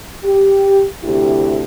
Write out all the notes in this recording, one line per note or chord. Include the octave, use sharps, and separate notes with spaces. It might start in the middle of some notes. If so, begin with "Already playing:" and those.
G4
D2 C3 E4 G4